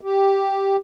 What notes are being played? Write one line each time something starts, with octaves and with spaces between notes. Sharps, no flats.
G4